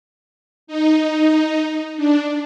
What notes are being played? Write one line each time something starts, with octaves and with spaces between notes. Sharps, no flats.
D#4
D4